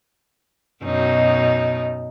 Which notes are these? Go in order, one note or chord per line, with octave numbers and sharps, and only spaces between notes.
F#2 B2 D#4